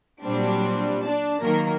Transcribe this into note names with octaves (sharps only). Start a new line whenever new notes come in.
A#2 F#3 G3 C4 D4
D4 D5 A5
D#3 F#3 A#3 A#4